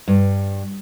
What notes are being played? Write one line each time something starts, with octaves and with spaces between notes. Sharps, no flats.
G2